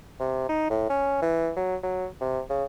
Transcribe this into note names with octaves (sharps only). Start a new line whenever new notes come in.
C3
D#4
A2
C#4
E3
F#3
F#3
C3
C#3